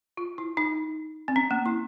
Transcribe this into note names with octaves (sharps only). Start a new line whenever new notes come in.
F4
E4
D#4
C4
C#4
A#3
E4